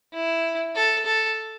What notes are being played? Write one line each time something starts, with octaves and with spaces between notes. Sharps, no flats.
E4
A4
A4